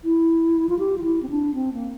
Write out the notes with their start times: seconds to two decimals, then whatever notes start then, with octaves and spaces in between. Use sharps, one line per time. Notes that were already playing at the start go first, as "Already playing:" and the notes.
0.04 E4
0.69 F4
0.79 G4
0.98 F4
1.03 E4
1.23 C4
1.30 D4
1.54 C4
1.74 A#3